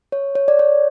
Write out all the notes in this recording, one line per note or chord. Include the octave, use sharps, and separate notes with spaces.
C#5
C#5
D5
C#5